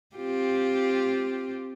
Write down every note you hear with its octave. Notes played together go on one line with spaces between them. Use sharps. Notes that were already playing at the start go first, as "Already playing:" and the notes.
C4 F4 G4